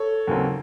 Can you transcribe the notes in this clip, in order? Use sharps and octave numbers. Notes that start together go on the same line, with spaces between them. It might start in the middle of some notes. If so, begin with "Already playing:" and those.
Already playing: A4 C#5
D#2 C#3 F#3 C4